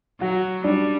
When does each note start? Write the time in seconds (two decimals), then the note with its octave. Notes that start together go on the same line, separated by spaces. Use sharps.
0.21 F#3 F#4
0.64 G3 D4